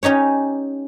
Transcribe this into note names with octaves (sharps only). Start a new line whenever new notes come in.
C#4 D#4 G4 C#5